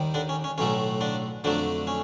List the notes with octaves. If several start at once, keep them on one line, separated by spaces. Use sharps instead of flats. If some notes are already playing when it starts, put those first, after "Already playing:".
Already playing: D#2 D#3 G3
D3 D4
C#4
C#4
B1 A2 F#3 A3 C#4
D3 D4
F2 D3 F#3 A3 D4
C#4